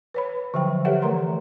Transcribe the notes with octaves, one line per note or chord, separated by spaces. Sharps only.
B4 C#5 B5
D3 F3 F#3 G5
G4 A4 B4 C#5 E5 F#5
E3 A3 A#4 A#5 C6